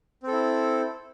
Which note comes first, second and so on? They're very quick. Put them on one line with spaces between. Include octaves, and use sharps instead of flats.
C4 A4 E4